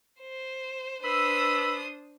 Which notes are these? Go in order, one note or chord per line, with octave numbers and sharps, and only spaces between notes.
C5
D4 B4 C5 B5 D#6 E6